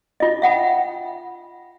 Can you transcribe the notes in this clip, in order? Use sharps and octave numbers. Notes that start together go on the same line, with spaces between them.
F4 D#5
E5 F#5 G5 B5